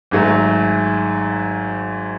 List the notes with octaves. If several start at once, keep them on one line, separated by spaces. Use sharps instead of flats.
G#1 G#2 F#3 A3